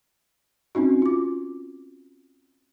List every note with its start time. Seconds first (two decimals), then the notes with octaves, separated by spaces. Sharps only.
0.75 C4 C#4 D#4 F#4
1.02 F4 D6